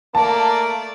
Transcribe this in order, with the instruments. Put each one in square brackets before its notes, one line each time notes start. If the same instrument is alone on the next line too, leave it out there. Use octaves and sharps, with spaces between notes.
[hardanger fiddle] A3 D5 [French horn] A#3 [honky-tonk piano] A5